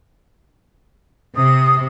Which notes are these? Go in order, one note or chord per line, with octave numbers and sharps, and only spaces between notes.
C3 D#6